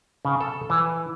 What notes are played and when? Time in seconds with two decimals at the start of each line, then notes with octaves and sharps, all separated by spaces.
0.25 C#3
0.41 A4
0.70 E3